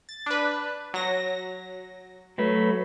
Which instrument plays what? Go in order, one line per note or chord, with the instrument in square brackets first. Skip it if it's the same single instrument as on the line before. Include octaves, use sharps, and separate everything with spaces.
[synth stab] A6
D4 B4
F#3 A#6
[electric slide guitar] F#3 A3 B4